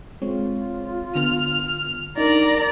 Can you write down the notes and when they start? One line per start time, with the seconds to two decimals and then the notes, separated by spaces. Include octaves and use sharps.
0.22 G#3 C4 F4 C#5
1.15 D3 B3 F6
2.17 D4 D#4 A#4 D5 A#5